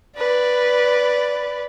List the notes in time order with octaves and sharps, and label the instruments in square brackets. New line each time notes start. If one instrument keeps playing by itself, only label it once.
[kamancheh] B4 D5